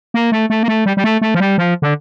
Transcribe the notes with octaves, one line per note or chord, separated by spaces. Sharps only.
A#3
A3
A3
A#3
A3
G3
G3
A3
A3
F3
G3
F3
D3